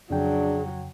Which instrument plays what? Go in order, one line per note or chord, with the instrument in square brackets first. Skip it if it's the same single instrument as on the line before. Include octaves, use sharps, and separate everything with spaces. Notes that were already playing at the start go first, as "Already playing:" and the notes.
[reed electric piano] F2 C#3 G5 [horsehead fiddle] F#3 [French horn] D4 [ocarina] G#4